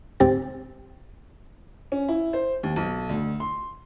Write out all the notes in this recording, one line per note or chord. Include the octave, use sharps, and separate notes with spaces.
D2 G#2 C4 G4 A6
C#4
E4
C5
D#2
B1
D2
C6